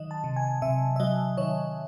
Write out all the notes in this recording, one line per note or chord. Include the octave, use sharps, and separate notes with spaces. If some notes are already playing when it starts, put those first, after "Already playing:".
Already playing: D#3 F#3 D#5
A5
C3
G#5
C3 E5
E5
F#3 D#5
D#3 C#5